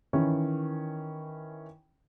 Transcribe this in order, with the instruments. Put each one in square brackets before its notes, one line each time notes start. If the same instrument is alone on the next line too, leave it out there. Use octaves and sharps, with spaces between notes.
[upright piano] D#3 E3 C#4